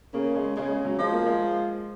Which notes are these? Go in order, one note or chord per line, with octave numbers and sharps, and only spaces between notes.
C#3 A#3
G#3
C#3 G#3
G#3
F#3
F3 G#3
A#3
G#3